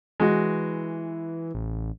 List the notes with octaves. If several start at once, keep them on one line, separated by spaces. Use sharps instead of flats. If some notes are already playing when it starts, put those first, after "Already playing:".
E3 G#3 F#4
A1